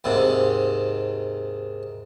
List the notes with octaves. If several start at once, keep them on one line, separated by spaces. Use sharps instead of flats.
D#2 G#2 C3